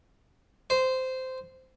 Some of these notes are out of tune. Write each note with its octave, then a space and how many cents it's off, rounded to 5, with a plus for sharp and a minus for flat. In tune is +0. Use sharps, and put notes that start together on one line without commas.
C5 -15